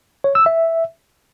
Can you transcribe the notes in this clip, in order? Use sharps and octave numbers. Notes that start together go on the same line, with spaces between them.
C#5
E6
E5